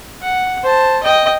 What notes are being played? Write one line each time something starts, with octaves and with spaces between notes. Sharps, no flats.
F#5
C5 A5
D#5 G5